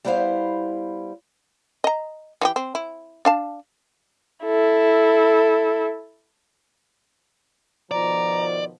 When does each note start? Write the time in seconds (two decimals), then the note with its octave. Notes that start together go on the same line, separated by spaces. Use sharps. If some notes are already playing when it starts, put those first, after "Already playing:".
0.05 G3 B3 E4 A#4 C5 F5
1.84 D#5 A#5
2.41 E3 F#4 G4
2.56 C4
2.75 E4
3.25 D4 F5 A5
4.44 E4 A4
7.91 B2 D#3 F3 D5 A#5